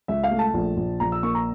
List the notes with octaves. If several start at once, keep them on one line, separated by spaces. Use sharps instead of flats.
C#2 E5
F5
A3
A5
A#1
A#1
A#1 A#5
E6
A#3 C#6
A#5